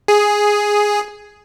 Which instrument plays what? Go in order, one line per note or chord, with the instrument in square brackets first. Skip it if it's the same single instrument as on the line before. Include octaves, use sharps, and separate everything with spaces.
[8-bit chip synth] G#4